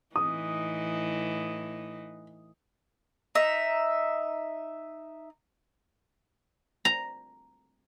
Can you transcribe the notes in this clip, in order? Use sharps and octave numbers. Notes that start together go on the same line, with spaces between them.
A2 E3 D#4 D#6
D#4 E5
A#5